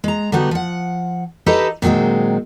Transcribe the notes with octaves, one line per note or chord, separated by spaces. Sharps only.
G#3 A#5
D3 G3 B3 D#4 F#4
F3 F#5
D#4 G4 A4 B4 D#5 E5
A#2 D#3 F#3 G#3 C4